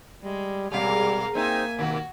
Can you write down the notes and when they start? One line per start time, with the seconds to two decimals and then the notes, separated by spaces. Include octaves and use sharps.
0.24 G3 G#3
0.72 B2 G3 G#3 A#4 F5
1.35 A#3 C4 D#4 E5 G#5
1.79 B2 D#3 F#4